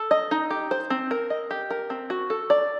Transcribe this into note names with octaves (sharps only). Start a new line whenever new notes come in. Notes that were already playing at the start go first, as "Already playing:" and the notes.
Already playing: A4
D#5
D#4
G4
C5
C4
A#4
D#5
G4
A#4
C4
F#4
A4
D5